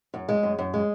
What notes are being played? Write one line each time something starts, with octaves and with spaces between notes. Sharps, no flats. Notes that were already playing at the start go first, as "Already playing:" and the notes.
F#2
G#3
F#2
F#2
G#3